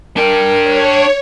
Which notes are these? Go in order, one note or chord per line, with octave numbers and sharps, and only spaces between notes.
D4 A#4 G5
C#5